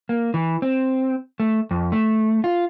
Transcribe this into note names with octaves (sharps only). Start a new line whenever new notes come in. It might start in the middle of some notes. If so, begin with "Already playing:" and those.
A#3
E3
C4
A3
F2
A3
F4